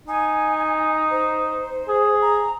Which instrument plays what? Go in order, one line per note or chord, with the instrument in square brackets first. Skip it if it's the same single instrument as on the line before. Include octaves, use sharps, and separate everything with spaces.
[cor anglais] D#4 [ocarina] G#5
[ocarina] C5
[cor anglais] G#4
[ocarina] A#5